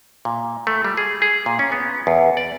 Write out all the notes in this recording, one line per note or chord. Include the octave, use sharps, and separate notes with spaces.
A#2
A3
G3
G#4
G#4
A#2
C#4
B3
E2
D5